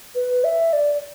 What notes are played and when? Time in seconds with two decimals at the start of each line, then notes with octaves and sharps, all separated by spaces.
0.15 B4
0.44 E5
0.73 D5